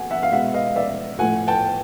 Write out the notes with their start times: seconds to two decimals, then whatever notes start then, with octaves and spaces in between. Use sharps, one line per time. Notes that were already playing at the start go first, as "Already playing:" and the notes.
Already playing: F#3 F#5 G#5
0.11 E5 F#5
0.23 F5
0.32 B2 G#3 B3 E5 F#5
0.54 D#5 F5
0.76 D5 E5
1.19 A2 F3 A3 F#5 G#5
1.48 G5 A5